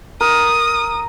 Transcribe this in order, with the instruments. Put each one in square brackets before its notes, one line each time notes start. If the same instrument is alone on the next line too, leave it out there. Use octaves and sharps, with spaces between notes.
[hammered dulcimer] A#4 [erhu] D#6